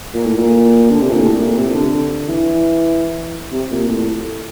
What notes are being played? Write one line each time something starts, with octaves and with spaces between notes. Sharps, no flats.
A#2
A2
A#2
D3
C3
A#2
A2
A#2
C3
D3
E3
C3
A#2
A2